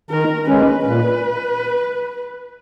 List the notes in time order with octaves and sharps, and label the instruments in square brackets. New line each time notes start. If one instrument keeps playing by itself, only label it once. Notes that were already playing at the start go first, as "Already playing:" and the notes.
[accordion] D#3 [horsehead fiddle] A#4
[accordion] G#3 C#4 [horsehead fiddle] B4
[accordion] A#2 [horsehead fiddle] B4